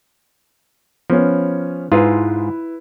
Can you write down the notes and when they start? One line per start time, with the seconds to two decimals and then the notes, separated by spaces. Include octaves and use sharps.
1.10 F3 B3 C#4
1.92 G#2 E4 F4 G#4 B4